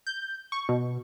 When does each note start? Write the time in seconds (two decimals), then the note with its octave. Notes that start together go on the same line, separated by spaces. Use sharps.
0.07 G6
0.52 C#6
0.69 B2